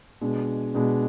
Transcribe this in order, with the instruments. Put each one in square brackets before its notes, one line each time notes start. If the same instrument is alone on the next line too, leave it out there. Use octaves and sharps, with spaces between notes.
[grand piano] B2 G#3 D4
B2 G#3 D4